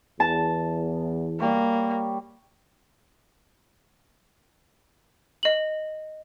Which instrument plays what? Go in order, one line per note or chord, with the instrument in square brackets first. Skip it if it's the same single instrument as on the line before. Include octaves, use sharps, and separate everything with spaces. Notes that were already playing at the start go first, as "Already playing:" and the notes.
[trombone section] E2 [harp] A5
[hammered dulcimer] G3 C#5 [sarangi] A#3
[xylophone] D#5 F#7